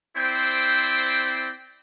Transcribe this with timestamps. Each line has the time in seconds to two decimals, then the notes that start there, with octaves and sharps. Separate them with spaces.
0.17 C4 E4 C5 D5 G5